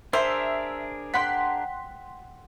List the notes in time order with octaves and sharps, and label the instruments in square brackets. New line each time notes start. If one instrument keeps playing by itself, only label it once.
[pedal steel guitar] D4 G#4 A#4 [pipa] C5 [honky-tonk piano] E5
[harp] F#5 G5 [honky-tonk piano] C6 F#6 B6